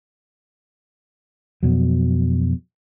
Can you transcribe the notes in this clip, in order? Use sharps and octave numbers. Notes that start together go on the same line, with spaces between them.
F2 B2 F#3